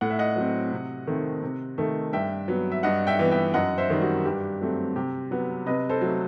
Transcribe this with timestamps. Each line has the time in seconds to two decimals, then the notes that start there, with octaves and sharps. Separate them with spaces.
0.01 A2 F#5
0.10 E5
0.19 D#5 F#5
0.36 F#3 C4
0.72 C3
1.07 D#3 A3 C4
1.42 C3
1.78 D#3 A3
2.13 G2 E5 G5
2.48 F#3 B3
2.72 E5
2.83 G2 D#5 F#5
3.07 E5 G5
3.19 E3 B3
3.31 E5 G5
3.54 F#2 D#5 F#5
3.78 C5 E5
3.90 D#3 G3
4.02 F#4
4.25 G2 G4
4.61 F#3 A3 C4
4.96 C3 G4
5.31 F#3 B3
5.66 C3 B4 D#5
5.90 A4 C5
6.01 F#3 A3